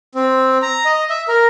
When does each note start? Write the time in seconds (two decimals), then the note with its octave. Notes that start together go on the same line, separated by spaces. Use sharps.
0.15 C4
0.62 A#5
0.85 D#5
1.10 E5
1.28 A#4